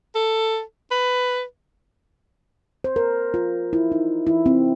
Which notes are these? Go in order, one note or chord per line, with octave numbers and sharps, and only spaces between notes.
A4
B4
C5
A#4
F4
E4
D#4
E4
C4